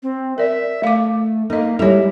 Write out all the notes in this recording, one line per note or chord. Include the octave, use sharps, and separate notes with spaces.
C4
A#4 D5 E5
A3 F5 D6
A#3 D#4 A4 D#5
G3 G#3 E4 A4 C#5